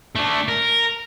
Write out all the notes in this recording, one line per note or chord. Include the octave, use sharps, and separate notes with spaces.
A3 D4
A#4